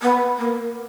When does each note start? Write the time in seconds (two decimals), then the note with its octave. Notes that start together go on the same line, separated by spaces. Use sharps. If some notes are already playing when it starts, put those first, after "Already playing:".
0.02 B3
0.38 A#3